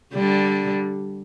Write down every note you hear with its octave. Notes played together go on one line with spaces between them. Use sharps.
D3 G3